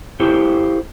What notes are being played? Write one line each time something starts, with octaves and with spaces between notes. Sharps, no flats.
E4 F4 G4 A4 C5